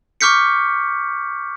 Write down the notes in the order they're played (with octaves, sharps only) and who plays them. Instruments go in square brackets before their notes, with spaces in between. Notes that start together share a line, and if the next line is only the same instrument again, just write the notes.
[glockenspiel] C#6 D6 F6 G6 B6 C#7